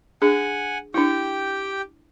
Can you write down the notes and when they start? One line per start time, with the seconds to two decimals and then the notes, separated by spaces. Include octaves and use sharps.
0.22 D4 G#4 F#5 G#5
0.94 D4 E4 G4 G5